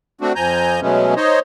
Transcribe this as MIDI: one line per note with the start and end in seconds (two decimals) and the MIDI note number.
0.21 0.33 57
0.21 0.33 60
0.21 0.33 62
0.21 0.33 66
0.36 0.80 41
0.36 0.80 53
0.36 0.80 80
0.36 0.80 82
0.36 0.80 91
0.81 1.14 47
0.81 1.14 54
0.81 1.14 56
0.81 1.14 57
0.81 1.14 59
0.81 1.14 61
1.16 1.39 63
1.16 1.39 72
1.16 1.39 73
1.16 1.39 75